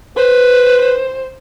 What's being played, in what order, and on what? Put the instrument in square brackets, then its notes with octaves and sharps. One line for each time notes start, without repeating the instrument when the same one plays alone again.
[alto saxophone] B4 [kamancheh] C5